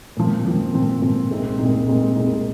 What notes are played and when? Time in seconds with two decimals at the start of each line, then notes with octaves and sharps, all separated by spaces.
0.17 A#2 F3 C4
0.45 A#2 F3 C4
0.73 A#2 F3 C4
1.02 A#2 F3 C4
1.31 C2 A#2 G#3 C4 D#4
1.59 C2 A#2 G#3 C4 D#4
1.87 C2 A#2 G#3 C4 D#4
2.16 C2 A#2 G#3 C4 D#4